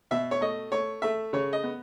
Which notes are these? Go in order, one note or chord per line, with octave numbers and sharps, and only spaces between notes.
B2 E5
C#5
A3 D#5
A3 C#5
A3 E5
C#3 C#5
D#5
B3